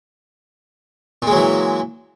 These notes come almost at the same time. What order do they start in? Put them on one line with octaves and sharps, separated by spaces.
A#2 G#3 F#3 E3